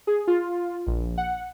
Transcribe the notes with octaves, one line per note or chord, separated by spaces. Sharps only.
G#4
F4
A#1
F#5